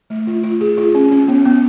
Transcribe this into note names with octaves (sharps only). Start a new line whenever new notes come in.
A3
F4
F4
G#4
F4
C#4
C#4
B3
B3